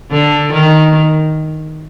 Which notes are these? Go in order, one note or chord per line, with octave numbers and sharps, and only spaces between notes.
D3
D#3